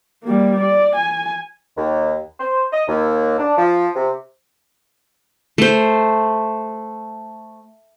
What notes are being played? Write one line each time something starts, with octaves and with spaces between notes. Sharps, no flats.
G3 A#3
D5
G#5
D#2
C5
D#5
D#2
D4
F3
C3
A3 C5